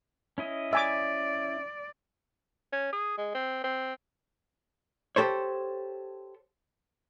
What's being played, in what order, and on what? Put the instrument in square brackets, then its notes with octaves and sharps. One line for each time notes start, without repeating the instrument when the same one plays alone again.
[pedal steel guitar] C#4 E4 D#5
[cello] D5 [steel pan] E5 G#5 D6
[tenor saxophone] C#4
G#4
G#3
C4
C4
[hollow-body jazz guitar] G4 A4 C5 C#5